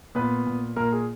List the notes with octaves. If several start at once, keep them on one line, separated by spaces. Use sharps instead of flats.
A#2 B3 B4
A#2
A#2 A#3 A#4
G#4